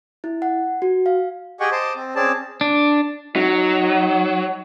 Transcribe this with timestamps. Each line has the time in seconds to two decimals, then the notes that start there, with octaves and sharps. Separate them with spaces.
0.24 E4
0.42 F#5
0.82 F#4
1.06 F5
1.60 G4 G#4 D#5 F#5 G5 C#6
1.72 C5 D#5 A5 C6 D6
1.96 C4
2.15 C4 C#4 G#4 D5 A5
2.61 D4
3.36 F#3 D#4